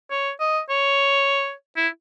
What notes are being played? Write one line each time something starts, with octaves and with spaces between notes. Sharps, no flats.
C#5
D#5
C#5
E4